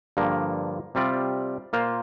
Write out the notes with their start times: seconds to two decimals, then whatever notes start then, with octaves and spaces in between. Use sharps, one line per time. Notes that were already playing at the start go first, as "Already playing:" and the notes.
0.17 G2 D3 F3 A#3
0.95 C3 G3 C4 F4 D5
1.73 A#2 A#3 F4 C5 F5